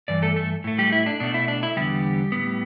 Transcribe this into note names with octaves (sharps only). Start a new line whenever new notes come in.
G2 E3 D5
A3 A4
A3 A4
A2 A3
G3 G4
E4
D4
B2 A3 D4
E4
D4
E4
E2 D3 G3 B3 G4
A2 G3 B3